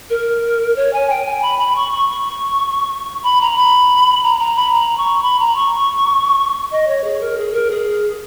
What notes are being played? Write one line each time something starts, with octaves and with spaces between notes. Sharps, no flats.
A#4
C#5
G#5
G5
G#5
B5
B5
C#6
C#6
C#6
B5
A#5
B5
A#5
A#5
B5
A#5
C#6
B5
A#5
C#6
D#5
C#5
G#4
A#4
G#4
A#4
G#4